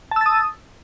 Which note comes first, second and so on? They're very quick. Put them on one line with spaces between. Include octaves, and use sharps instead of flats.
A5 E6 A6 D#6